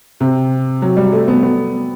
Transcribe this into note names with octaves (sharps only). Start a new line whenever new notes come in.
C3
F#3
G3
A3
B3
B3